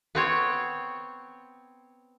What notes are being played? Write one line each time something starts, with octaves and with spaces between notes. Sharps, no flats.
B3 C4 C#5